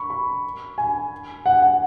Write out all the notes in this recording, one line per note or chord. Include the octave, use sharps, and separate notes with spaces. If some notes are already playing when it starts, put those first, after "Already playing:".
Already playing: B5 C#6
B5
G#5
F#5
F#5